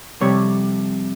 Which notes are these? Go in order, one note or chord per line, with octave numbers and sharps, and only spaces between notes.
F2 C3 G3 C#5